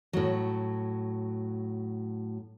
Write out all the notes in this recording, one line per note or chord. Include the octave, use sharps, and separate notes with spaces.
A2 F#3